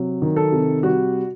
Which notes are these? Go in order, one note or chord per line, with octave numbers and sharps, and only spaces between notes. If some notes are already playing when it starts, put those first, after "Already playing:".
Already playing: C3 F#3
D#3
A4
C3
G3 F#4